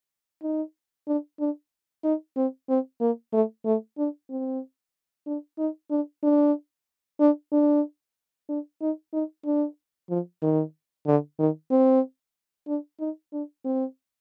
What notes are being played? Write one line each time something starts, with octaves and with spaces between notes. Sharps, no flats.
D#4
D4
D4
D#4
C4
C4
A#3
A3
A3
D4
C4
D4
D#4
D4
D4
D4
D4
D4
D#4
D#4
D4
F3
D#3
D3
D#3
C4
D4
D#4
D4
C4